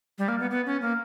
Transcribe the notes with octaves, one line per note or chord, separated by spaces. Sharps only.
G3
A#3
B3
B3
C#4
A#3